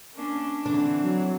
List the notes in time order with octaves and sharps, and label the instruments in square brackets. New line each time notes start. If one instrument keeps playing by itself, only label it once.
[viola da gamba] A#3 C#4 D4
[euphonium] D3 [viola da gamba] E3 C4 [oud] D4
[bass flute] F#3